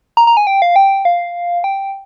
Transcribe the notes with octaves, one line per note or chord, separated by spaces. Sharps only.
A#5
A#5
G#5
G5
F5
G5
F5
G5